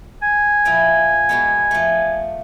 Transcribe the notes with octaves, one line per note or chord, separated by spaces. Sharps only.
G#5
A#2 F3 E4
B2 G#3 B3
F3 A3